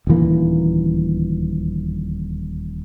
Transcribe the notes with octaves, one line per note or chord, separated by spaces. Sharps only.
D#1 D2 E3 A#3